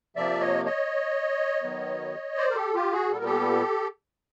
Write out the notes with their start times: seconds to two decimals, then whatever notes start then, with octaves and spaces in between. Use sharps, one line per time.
0.16 C3 F3 A#3 D5 E5
0.41 C#5 D#5
0.65 C#5 D#5
1.63 D#3 F#3 B3
2.37 C5 D5
2.50 A#4
2.55 G4 A4
2.74 F4 G4
2.92 F#4 G#4
3.11 A#2 G3 B3 A4
3.17 A#4
3.25 G4 A4